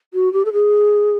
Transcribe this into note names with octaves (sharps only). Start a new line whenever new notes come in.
F#4
G4
A4
G#4